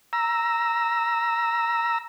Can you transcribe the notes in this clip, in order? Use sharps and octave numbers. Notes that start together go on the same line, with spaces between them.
A#5 E6